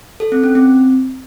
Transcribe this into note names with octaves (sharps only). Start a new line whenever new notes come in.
A4
C4
C#4
C4